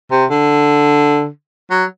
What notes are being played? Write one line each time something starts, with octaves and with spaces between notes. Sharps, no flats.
C3
D3
F#3